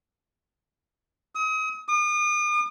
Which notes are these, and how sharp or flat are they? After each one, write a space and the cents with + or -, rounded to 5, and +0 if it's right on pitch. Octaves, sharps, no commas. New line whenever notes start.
D#6 +35
D#6 -40